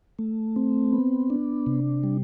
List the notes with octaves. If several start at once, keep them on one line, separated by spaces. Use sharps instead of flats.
A3
C4
B3
D4
C3
G3